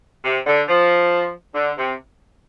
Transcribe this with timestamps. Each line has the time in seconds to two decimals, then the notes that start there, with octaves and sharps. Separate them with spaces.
0.25 C3
0.46 D3
0.68 F3
1.55 D3
1.78 C3